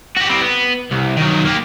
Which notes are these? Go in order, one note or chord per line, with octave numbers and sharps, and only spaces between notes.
F#4 G4
G3 C4
B3
C2
D#3 F#3
A#3 G4